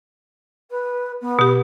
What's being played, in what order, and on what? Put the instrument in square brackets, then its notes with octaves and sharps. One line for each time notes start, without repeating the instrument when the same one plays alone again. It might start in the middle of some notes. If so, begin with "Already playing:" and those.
[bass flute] B4
B3
[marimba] B2 G4